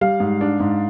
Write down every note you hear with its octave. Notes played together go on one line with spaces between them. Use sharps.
G3 F5
G#2
D4
G#2